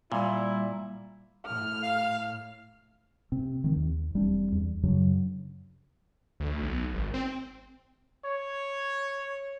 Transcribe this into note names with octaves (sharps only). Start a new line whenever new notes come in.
A#2 G3 E4
A2 F6
F5
C3 C4
D#3 G#3 C4
D#2
E1 G3 C4 D4
E2
F#2 C#3 F#3 D4
D2
B1
G#1
C4
C#5